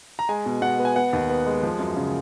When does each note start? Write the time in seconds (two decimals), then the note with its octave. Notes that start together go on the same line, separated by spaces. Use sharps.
0.19 A#5
0.29 G#3 G#5
0.46 B2
0.62 B2 F#5
0.79 B3
0.85 G#5
0.96 B3 F#5
1.13 D#2
1.29 B3
1.46 G#3
1.63 F3
1.79 F#2
1.96 C#3